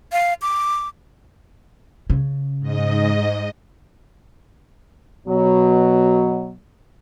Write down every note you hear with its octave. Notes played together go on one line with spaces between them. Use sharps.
F5
D6
C#3
G#2 D#5
B2 F#3